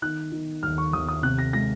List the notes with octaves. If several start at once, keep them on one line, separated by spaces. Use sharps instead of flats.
D#3 F#6
D#3
D#2 F6
C#6
D#2 D#6
D#6
C3 F#6
A#6
G#3 A#6